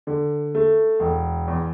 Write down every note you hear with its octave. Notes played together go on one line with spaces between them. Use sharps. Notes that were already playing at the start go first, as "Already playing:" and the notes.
D3
A3
E1
E2